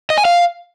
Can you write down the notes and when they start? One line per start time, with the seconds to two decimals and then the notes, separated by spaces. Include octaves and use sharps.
0.10 D#5
0.18 G#5
0.25 F5